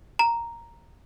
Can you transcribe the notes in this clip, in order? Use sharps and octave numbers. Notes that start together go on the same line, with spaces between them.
A#5